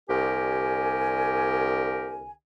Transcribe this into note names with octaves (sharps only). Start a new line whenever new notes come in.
C2 D3 G4 A#4 G#5